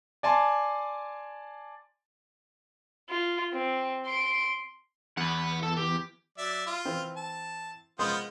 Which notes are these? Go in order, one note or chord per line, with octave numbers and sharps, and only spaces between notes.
D5 G#5 A5 C6
F4
C4
C6 D7
E2 F#5 B5
A4
G4
F#3 D5 E5
F4
E3 C4
A5
G#3 B3 F4 C5 C6 D#6